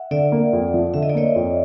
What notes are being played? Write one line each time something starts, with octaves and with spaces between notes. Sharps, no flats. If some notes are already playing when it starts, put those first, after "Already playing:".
Already playing: E5 F#5
D3 D5 E5
A#3
F2
F3
D3 E5
D#5
D5
A#3 C#5 D#5
F2